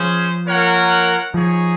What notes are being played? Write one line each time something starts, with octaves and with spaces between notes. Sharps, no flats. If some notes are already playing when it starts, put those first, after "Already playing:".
Already playing: F3 C#4 G#4 C5
A#3 F4 A#4 C#5 F#5
F3 D#4 G#4 C#5